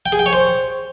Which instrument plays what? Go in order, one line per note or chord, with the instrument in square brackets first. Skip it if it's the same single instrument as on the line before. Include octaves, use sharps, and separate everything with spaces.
[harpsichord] G5
G#4
G5
C#5
C5